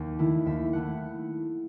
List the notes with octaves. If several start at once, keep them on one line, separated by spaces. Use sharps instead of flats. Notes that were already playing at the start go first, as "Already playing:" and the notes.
Already playing: D#2
D#3 A3 E4
D#2 E5
D#3 A3 E4 F#5